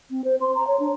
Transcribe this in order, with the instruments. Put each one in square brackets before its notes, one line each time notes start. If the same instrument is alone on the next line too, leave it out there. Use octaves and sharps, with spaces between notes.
[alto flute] C4
C5
C6
A#5
C#5
D4